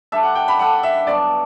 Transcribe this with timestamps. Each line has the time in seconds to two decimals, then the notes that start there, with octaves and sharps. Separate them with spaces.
0.12 G3 D4 A4 E5
0.23 F#5
0.35 G5
0.48 B5
0.59 G3 D4 A4 F#5
0.83 E5
1.07 G2 D3 F#3 B3 D5